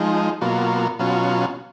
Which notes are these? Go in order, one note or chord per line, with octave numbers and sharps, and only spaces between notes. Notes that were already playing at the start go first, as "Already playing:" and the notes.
Already playing: F3 G#3 D#4
B2 F#3 A#3 F4
B2 F#3 C#4 F4